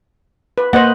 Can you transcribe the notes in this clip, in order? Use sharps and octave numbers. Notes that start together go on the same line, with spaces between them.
B4
A#3 B4 C5 D#5 F#5